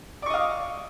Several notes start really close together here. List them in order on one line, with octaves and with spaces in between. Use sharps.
D5 C#6 D#5 F5